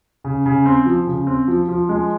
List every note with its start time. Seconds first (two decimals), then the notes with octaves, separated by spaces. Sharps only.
0.24 C#3
0.46 C#3
0.66 C4
0.86 F3
1.07 C#3
1.27 C4
1.48 F3
1.69 F3
1.89 G#3